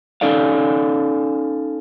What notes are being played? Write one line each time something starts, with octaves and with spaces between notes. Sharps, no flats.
C#4 D#4 A4 D5 F5